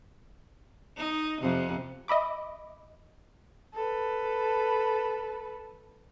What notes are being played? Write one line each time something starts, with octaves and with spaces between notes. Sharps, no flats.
D#4
F2 C3
D#5 E5 B5 D6
A4 B4